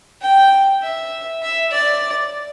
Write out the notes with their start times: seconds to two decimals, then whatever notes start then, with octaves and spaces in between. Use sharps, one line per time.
0.21 G5
0.82 E5
1.42 E5
1.71 D5